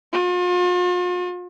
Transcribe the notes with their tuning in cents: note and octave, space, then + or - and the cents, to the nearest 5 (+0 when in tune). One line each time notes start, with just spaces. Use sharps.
F4 +40